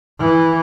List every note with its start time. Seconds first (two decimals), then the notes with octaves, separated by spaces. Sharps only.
0.20 E3